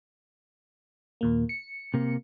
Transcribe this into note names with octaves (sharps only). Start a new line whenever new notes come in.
D#2 A#2 A#3
C#7
C3 A#3